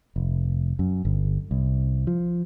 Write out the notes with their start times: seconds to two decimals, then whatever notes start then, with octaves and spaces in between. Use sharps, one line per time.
0.16 F1
0.79 F#2
1.05 G1
1.51 C2
2.07 F3